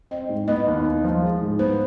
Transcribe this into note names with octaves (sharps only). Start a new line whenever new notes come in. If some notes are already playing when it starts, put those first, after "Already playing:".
C4 D#5
G#2
B3 D#5
D#2
D#4
F3
G#3
G#2
B3 C5